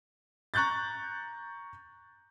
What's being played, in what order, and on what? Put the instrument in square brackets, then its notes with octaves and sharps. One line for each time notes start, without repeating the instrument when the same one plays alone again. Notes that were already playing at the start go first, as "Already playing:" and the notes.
[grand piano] A#5 C#6 F#6 G6 A6